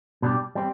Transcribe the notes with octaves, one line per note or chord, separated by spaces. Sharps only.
B2 G3 D4 G4
G3 C4